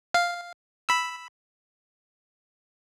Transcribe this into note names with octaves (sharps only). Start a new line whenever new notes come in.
F5
B5 E6